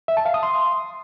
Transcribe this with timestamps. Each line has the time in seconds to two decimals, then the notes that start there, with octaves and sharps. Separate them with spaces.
0.08 E5
0.17 A5
0.25 F5
0.34 D#6
0.43 C6